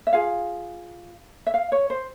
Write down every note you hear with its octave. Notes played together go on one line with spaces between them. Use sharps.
E5
F4 G#4 F5
E5
F5
C#5
C5